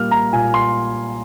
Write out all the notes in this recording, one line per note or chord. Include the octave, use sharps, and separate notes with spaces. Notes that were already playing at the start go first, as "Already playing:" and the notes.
Already playing: A#2 G3 A#3 F6
A#5
A#2 G#5
C6